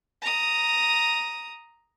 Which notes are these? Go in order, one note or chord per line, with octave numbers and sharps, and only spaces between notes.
A#5 D#6